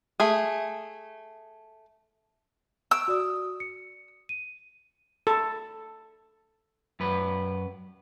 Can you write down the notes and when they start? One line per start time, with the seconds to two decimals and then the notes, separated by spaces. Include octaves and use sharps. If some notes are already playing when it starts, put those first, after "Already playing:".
0.20 A3 G#4
2.91 C#6 E6 D7
3.08 F#4 D5 D#6
3.60 C#7
4.29 D#7
5.27 A4
7.00 F#2 B4